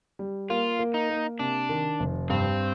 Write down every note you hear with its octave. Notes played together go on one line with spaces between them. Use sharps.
G3
A#3 F4
A#3
D#4
A#3
C3 D4
D#3
F1
G2 C4